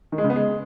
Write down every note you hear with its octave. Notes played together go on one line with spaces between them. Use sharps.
D#3
G#3
C#3
B3
G#3